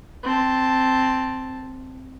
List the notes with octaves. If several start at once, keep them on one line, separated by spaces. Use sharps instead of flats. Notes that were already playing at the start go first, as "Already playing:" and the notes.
C4 A5